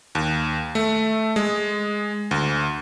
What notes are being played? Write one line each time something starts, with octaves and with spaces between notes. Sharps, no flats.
D#2
A3
G#3
D2